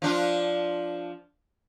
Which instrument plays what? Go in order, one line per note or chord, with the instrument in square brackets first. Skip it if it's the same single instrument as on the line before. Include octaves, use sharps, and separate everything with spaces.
[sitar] F3 D4 F4